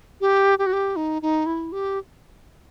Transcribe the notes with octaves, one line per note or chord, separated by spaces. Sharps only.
G4
G4
F#4
G4
D#4
D#4
E4
G4